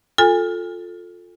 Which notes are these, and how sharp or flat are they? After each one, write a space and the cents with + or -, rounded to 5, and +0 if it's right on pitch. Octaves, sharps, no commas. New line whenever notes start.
F4 +20 A4 +0 G#5 -30